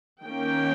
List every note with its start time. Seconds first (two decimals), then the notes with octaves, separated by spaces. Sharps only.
0.25 D#3 A#3 C#4 G5